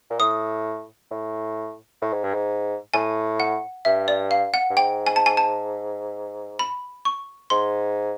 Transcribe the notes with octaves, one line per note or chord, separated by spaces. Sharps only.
A#2
A2 D#6
A2
A2
G#2
G2
G#2
A2 G#5
F#5
G2 E5
D5
F5
F#5
G2
G#2 G5
G#5
A5
G#5
A5
B5
C#6
G#2 C6